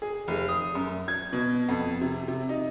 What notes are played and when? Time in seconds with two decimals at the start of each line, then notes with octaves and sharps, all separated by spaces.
0.02 G#4
0.28 F1
0.49 D#6
0.75 F#2
1.08 G#6
1.33 B2
1.69 F2
2.01 C3
2.28 C3
2.49 D#4